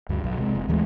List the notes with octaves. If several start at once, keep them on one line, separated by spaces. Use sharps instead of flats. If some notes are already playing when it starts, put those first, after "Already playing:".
D2 G2
B1 F#3
C3 G#3
F1
D#2 E3 G#3 A3